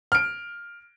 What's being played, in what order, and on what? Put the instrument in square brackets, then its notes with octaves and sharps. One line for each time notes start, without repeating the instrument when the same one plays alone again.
[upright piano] F6 D7